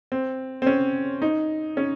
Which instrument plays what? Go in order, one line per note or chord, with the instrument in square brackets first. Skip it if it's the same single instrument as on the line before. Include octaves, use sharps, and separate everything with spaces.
[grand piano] C4
C4
C#4
D#4
C#4